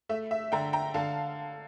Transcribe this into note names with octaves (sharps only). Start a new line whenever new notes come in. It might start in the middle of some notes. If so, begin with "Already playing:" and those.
A3 E5
E5
D3 G5 A#5
G5 A#5
D3 F5 A5